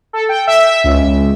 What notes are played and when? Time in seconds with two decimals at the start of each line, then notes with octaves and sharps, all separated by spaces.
0.13 A4
0.29 G5
0.47 E5
0.84 C#2